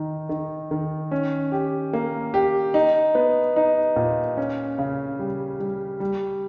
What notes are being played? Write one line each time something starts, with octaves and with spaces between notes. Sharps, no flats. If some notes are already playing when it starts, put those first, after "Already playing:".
Already playing: D#3 D#4
D#3
D#3
C#4
G4
A#3
G4
D#4
B3
D#4
A#2
C#4
C#3
G3
G3
G3